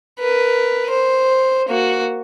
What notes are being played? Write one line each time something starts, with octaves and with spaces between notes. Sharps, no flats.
A#4 B4
C5
A#3 F#4